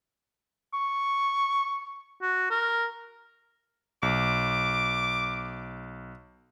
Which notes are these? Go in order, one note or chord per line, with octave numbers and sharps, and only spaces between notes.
C#6
F#4
A#4
B1 D6